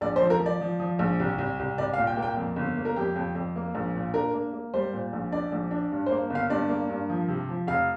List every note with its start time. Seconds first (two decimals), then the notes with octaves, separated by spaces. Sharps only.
0.01 A#1 D5
0.16 C5
0.22 F3
0.30 A#4
0.40 F3
0.46 D5
0.61 F3
0.80 F3
0.99 A#1
1.20 C2
1.38 C2
1.59 C2
1.78 C2 D5
1.93 F5
1.98 A#2
2.07 G5
2.17 A#3
2.22 G5
2.37 F2
2.56 G1
2.77 A#3
2.85 A#4
2.96 F2 G4
3.16 F2
3.35 F2
3.56 A#3
3.75 A#1
3.95 A#2
4.14 D4 A#4
4.34 A#3
4.53 A#3
4.74 G3 C5
4.93 A#2
5.13 A#1
5.32 D4 D5
5.52 A#1
5.71 D4
5.92 G2
6.06 C5
6.11 A#3
6.30 G1 F5
6.50 G2 D5
6.69 A#3
6.89 G2
7.10 F3
7.28 C3
7.49 F3
7.67 F1 F5